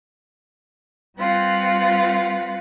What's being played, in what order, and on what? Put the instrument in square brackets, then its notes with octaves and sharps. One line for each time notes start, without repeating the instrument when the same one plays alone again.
[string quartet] G3 C4 F4 B4 F#5